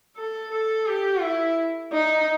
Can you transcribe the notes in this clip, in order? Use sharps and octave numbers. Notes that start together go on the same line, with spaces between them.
A4
A4
G4
E4
D#4